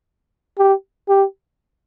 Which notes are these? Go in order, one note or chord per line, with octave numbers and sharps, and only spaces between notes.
G4
G4